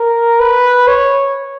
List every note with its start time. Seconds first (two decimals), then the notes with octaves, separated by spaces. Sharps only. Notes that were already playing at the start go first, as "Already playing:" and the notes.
Already playing: A#4
0.40 B4
0.87 C#5